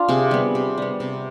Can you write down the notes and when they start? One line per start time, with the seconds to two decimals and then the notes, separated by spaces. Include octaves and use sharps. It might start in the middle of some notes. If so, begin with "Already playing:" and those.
Already playing: D4 F4
0.09 C3 G#4
0.31 G3 B3
0.55 C3
0.78 G3 B3
1.00 C3